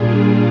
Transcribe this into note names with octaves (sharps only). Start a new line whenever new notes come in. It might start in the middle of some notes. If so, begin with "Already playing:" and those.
Already playing: A#2 G3 D4 F4 G#4